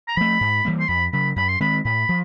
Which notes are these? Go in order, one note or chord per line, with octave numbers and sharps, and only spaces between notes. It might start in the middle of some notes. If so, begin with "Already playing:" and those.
A#5
F3 A3 B5
G#2
E3 G3 A#3
C6
F2 B5
C#3 F#3 B5
F#2 B5
C6
D#3 G#3 C4 B5
A2 B5
F3